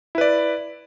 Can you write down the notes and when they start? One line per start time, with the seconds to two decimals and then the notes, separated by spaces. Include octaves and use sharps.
0.15 E4
0.18 B4
0.21 D5